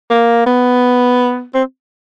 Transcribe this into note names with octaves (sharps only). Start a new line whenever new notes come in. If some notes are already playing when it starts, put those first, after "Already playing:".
A#3
B3
C4